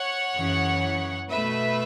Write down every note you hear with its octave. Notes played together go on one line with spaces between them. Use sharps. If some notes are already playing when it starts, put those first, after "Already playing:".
Already playing: C#5 F#5
F#2 C#3 E3
B2 A3 B4 E5